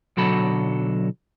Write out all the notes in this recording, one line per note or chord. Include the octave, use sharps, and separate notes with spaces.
B1 D3 F#3 F#4 A4 B5